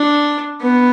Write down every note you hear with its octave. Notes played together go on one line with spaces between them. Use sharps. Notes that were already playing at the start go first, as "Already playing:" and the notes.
Already playing: D4
B3